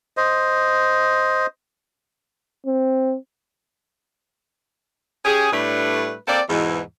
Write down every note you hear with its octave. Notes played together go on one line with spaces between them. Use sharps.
C5 D#5
C4
C#4 G4 G#4
A2 G3 A3 D4 B4
A#3 C4 A4 D5
E2 G#2 B2 E3